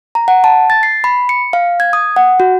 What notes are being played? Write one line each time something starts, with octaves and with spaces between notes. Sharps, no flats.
A#5
F#5
A5
A6
C7
B5
C#7
F5
G#6
D#6
F#5
F#4